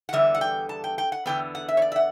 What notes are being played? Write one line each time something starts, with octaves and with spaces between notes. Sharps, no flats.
F#5
E2 D3 G3 B3 E5
F#5
G5
A5
G5
G5
F#5
E2 D3 G3 B3 G5
F#5
E5
C#5
D5
E5
F#5